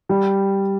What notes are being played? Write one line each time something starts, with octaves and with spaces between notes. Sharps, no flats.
G3